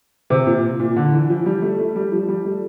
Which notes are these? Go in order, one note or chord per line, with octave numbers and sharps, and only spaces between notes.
C3
A#2
A#2
D3
E3
F3
G3
A3
A3
G3
F3
G3
A3